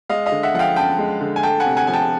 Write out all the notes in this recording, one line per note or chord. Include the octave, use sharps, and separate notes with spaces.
G#3 D#5 F5
D#5 F5
D3
E5 F#5
F3 F5 F#5 G5
F#2 G5 A5
G#3
D3
G#5
A3 G5 A5
F#5 G#5
C3
F#5 G#5
F3 G#5
G5 A5